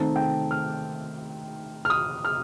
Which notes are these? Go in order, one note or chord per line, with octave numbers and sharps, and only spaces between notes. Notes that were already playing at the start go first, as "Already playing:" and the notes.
Already playing: D#3 A3 C4 D#4 A5
G5
F6
F6
D#6
F6